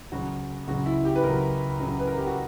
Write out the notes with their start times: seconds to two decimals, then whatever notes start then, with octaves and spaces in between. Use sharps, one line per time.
0.12 C#2 C#3 F#3 F#4
0.68 C#2 C#3 F#3 F#4
0.86 E4
1.05 G4
1.16 B4
1.23 C#2 C#3 F#3 A#4
1.80 C#2 C#3 F#3
1.99 B4
2.08 A#4
2.17 G4
2.27 F#4